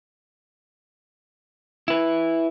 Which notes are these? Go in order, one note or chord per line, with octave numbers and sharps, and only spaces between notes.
E4 B4